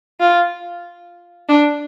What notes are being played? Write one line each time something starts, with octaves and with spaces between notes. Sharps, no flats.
F4
D4